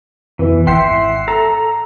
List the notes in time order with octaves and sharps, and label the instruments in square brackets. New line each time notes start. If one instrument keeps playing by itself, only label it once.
[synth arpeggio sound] F2 B2 [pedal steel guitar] E3
[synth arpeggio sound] G#1 G5 C7 [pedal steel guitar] E5 F#5 C6
[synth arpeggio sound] A4 [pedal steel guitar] A#5